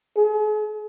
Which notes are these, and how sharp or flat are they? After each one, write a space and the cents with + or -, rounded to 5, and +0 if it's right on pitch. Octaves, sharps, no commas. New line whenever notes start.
G#4 +40